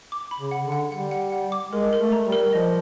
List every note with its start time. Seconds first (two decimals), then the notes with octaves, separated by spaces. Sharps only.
0.12 D6
0.31 B5
0.39 C#3
0.51 F#5
0.65 D3
0.72 F#5
0.92 G3 F#5
1.11 F#5
1.32 F#5
1.52 D6
1.72 G#3 A#4
1.93 A#4
1.99 A3
2.12 A#5
2.26 G3
2.32 A#4
2.53 F3 D#5